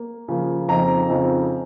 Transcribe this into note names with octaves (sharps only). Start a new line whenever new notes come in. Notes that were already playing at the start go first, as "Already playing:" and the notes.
Already playing: A#3
C#3 F3 A#3
F2 C#3 F3 C4 D#4 A#5
F2 C#3 F3 C4 D#4